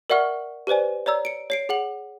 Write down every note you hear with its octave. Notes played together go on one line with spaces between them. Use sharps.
A#4 D5 E5 F#5 C#6 F6
G4 B4 C5 D5 G#5
C#5 D5 A#5 E6
C#7 D7
C#5 C7 D7
G#4 F#5 F#7